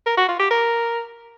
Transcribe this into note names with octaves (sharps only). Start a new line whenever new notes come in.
A#4
F#4
F4
G4
A#4